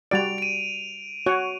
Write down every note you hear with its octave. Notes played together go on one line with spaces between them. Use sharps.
G3 F#4 D5 D7 F7
D7 D#7
F#4 C#5 F#5